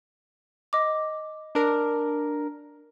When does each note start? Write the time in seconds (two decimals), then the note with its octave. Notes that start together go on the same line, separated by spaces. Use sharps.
0.73 D#5 D6
1.55 D4 A#4